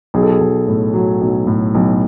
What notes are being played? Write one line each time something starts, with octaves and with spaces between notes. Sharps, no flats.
B1 G#4
A4
G#4
B1
A2
F#3
B1
A2
B1